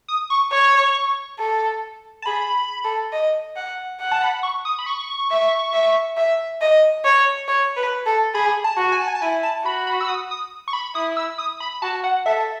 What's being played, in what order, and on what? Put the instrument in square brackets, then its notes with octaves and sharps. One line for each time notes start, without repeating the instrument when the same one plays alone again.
[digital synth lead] D#6
C#6
[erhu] C#5 [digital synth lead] C#6
[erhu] A4
[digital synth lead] A5
[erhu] G#4 [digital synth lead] B5
[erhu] A4
D#5
F#5
F#5
[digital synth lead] A5
B5
C#6
D#6
B5
C#6
[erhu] E5
E5
E5
D#5
C#5
C#5
B4
A4
[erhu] G#4 [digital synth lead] B5
[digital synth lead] A5
[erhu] F#4
[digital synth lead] G#5
A5
G#5
A5
[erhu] E4 [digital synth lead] G#5
[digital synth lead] A5
[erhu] F#4 [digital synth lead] B5
[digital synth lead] B5
E6
D#6
D#6
C#6
B5
[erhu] E4 [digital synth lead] D#6
[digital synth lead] E6
D#6
B5
[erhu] F#4 [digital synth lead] A5
[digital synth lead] F#5
[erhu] A4 [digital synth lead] E5